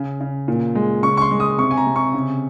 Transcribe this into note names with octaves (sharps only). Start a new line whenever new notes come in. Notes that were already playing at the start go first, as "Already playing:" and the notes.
Already playing: C#3
C#3
A#2
G#3
C#3 C#6
C#6
C6
G#3
D#6
C3 C#6
G#5
A#5
C3
C#6
C#3